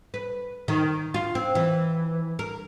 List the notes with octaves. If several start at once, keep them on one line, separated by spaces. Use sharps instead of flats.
B4
D#3
F4
C4
E3
A#4